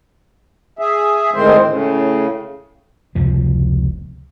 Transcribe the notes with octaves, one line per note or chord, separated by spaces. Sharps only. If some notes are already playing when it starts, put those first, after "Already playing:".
G#4 E5
D2 A2 D#3 G#3 C4 C5
A2 C#3
F1 C#2 C3 F3